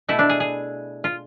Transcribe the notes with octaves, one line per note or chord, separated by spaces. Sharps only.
B2 A3 E4
D4
G#4
G#4
F4